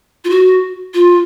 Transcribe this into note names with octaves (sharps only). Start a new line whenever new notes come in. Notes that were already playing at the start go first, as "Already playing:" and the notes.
F4
F#4
F4